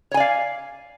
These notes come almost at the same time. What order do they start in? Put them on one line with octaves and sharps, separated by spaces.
C#5 G#5 D5 F5